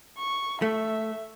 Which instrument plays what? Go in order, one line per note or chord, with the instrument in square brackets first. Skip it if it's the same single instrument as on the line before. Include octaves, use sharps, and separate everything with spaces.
[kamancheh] C#6
[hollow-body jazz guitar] A3 [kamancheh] E5